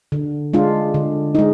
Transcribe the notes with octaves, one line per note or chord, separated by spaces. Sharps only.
D3
G#3 D4 F4
D3
G#3 D#4